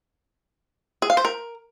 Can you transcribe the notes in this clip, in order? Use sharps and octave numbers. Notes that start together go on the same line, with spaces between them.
G#4
F5
C5
A#4